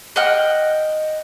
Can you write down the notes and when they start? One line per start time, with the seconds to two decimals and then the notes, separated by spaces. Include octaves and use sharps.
0.16 D#5 F#5 G5 F6